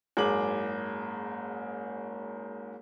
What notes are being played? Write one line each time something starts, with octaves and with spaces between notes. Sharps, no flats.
F#1 G#2 G#4 D6 F#7